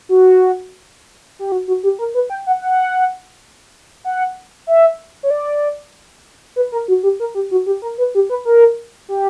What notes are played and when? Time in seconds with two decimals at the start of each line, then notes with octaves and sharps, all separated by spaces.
0.09 F#4
1.39 G4
1.52 F#4
1.68 F#4
1.83 G4
1.99 A#4
2.14 B4
2.30 G5
2.47 F#5
2.62 F#5
4.04 F#5
4.67 E5
5.23 C#5
5.30 D5
6.56 B4
6.72 A#4
6.88 F#4
7.03 G4
7.20 A#4
7.35 G4
7.51 F#4
7.66 G4
7.82 A#4
7.98 B4
8.15 G4
8.30 B4
8.45 A#4
9.09 G4